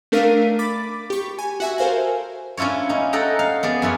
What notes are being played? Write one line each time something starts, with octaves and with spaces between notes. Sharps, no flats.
A3 D4 A#4 F5 B6 D#7
B5 D6 A6 B6
G4 C#6
G#5
F#4 E5 G#5
A4 A#4 C5 F5 G#5
C#4 D4 E4 F4 C#5
C#4 D#4
A4 D#5 F#5 G5 A#5
F5
B3 G#4 D5
F#2 E4 F4 C#5